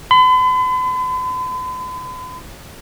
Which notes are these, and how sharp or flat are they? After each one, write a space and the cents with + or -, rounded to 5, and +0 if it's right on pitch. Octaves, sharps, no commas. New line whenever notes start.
B5 +45